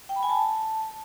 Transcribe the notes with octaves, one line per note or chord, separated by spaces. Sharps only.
G5
B5
G#5
A5